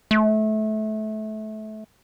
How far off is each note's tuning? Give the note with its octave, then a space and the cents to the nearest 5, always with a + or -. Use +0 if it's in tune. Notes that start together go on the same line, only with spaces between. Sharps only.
A3 -25